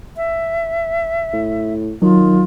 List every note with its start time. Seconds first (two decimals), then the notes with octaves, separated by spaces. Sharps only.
0.17 E5
1.33 A2
2.02 D#3 F#3 F4